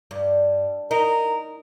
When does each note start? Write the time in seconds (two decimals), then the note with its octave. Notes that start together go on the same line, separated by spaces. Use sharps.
0.11 G2
0.91 D#4 A#4